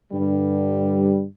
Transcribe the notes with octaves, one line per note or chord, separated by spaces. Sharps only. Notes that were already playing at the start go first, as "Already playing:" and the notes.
G2 D3 G3